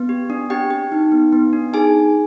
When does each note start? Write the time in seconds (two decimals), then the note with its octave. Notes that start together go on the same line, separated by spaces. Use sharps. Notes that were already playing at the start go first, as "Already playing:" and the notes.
Already playing: B3
0.09 G4
0.30 D4
0.50 C4 G4 G5
0.71 G4
0.92 D#4
1.12 B3
1.33 B3
1.53 D4
1.73 D#4 G#4 G#5